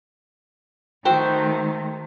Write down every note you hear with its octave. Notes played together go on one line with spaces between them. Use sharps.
D#3 A3 F#4 C5 E5 G5